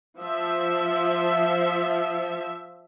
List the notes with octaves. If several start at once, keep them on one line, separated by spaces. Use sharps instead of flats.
F3 E5